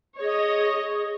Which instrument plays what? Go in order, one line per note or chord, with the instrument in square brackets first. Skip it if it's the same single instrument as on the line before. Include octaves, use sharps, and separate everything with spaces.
[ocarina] G#4 [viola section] C#5 D#5